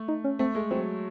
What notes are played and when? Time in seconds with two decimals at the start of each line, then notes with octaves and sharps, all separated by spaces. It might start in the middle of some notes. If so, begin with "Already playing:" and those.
Already playing: A3
0.08 D#4
0.24 C#4
0.39 A3 C4
0.55 G#3 A3
0.71 F#3 C4